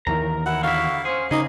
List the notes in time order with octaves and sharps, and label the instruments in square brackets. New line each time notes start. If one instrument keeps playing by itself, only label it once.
[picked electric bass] D#2 D#3 E3 [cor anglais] A#4 [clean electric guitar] A#5
[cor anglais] E4 [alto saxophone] F#5
[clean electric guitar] D3 D4 E4 [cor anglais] F#4 [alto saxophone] F5
[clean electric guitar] C#4 G#4 [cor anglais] C5
[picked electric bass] C#3 [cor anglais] A#3 [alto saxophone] D#4 [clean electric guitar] G#4